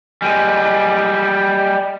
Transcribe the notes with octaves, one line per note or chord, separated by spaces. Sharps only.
G3 G#3